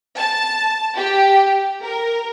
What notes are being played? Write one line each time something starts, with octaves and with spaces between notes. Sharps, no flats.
A5
G4
A#4